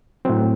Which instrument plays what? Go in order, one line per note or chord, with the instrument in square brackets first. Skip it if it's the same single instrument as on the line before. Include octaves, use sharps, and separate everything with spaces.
[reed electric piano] A2 F#3 C4